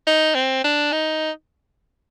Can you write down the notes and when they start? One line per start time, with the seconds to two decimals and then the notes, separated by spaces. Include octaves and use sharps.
0.07 D#4
0.35 C4
0.64 D4
0.92 D#4